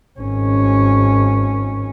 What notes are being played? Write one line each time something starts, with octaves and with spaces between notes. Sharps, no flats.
G#1 C#4